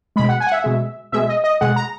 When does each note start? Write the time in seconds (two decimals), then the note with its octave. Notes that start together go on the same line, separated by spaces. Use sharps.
0.16 B2 G#3 B5
0.29 F#5
0.40 G#5
0.47 F#5
0.52 E5
0.64 B2 G#3
1.12 B2 G#3 E5
1.29 D#5
1.44 D#5
1.61 B2 G#3 F#5
1.76 A#5